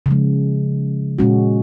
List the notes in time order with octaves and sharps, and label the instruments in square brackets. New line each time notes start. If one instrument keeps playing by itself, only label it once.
[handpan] C#3 F3 G#3
A#2 G#3 C#4 F#4